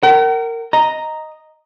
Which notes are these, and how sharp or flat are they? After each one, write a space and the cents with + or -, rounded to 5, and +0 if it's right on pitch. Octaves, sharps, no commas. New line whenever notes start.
A#4 -20 F#5 +45
D#5 +0 A#5 +0